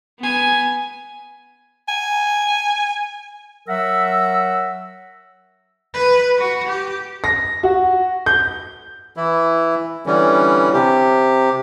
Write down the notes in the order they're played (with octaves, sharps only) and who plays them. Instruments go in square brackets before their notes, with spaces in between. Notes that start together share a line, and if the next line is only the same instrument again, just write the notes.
[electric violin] B3 G#5
[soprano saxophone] G#5
[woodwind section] F#3 A#4 E5 F#5 E6
[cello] B4
F#4
G4
[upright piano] A#6
F#4
G6
[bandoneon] E3 E4
D3 E3 G3 C#4
C3 G4